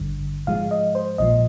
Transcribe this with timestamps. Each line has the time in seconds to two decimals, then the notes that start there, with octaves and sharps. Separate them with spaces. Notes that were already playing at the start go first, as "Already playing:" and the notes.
Already playing: G#1 G2 D3
0.47 G#2 F3 G#3 F5
0.71 D#5
0.95 C5
1.18 A#1 A#2 F3 D#5